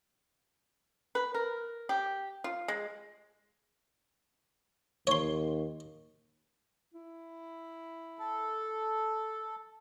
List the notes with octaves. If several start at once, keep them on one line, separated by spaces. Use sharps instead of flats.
B4
A#4
G4
F4
G#3
D#2 C#5 C6
E4
A4